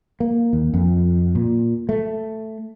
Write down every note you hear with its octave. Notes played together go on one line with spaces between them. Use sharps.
A#3
D#2
F2
A#2
A3